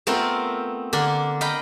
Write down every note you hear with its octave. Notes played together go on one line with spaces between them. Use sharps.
A3 B3 C4 F4 A#4
D3 A#3 D4
D#5 F5 G5 A#5 B5